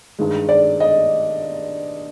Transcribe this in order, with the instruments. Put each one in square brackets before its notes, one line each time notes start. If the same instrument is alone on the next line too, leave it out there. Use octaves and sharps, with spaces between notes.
[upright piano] G2 D#3 G#3
[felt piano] D5
D#5